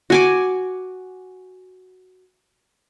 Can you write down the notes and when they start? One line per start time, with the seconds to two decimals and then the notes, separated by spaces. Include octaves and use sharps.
0.10 F#4 G#5 D6